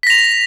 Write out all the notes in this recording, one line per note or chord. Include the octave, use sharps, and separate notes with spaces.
A#6 B6 F7